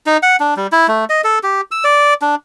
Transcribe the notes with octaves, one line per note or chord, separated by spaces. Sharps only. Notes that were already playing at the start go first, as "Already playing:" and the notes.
D#4
F#5
D4
G3
E4
A3
D#5
A4
G4
E6
D5
D4